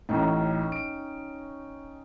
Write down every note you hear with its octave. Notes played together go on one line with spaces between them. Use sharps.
A1 A2 C#4 D#4 G5
D7